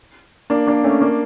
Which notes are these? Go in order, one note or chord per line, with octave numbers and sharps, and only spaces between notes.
A#3 D4
A#3 D4
A3 C#4
A#3 D4